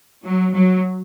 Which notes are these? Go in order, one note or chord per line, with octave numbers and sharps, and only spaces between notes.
F#3
F#3